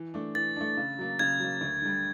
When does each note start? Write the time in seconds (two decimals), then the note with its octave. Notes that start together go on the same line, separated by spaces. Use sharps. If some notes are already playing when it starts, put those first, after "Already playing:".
Already playing: E3
0.14 A3 D4
0.35 E3 A6
0.56 A3 D4
0.77 C#3
0.99 F#3 A#3
1.19 C#3 G#6
1.40 F#3 A#3
1.61 D2
1.82 D3 G3